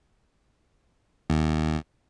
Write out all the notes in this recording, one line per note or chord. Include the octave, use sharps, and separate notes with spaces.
D#2